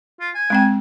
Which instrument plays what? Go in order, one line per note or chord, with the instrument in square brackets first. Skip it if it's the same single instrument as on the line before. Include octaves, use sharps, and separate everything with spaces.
[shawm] F4
G#5
[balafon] G#3 C4 G5